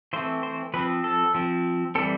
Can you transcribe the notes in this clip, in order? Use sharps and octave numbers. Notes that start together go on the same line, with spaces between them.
E3 A3 C4 C5
C5
F3 C4 B4
A4
F3 C4
E3 G3 C4 A4